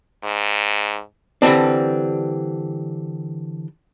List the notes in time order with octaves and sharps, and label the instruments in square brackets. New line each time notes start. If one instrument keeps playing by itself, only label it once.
[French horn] G#2
[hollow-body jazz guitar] D3 E3 G3 C4 D4